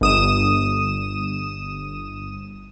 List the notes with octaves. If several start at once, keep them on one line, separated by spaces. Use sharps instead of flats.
G1 D#6 E7